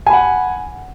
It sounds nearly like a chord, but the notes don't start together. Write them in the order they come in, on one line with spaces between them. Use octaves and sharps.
G#5 B5 F#5